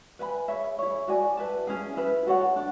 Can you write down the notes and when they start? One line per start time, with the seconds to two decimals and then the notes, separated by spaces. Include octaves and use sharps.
0.19 B4 E5 G#5 B5
0.48 G#4 C#5 E5
0.79 E4 G#4 C#5
1.08 F#4 A4 D5 G#5
1.37 B4 E5 A5
1.67 C#4 E4 G#4
1.97 E4 B4 E5
2.26 F#4 A4 C#5 F#5
2.56 D4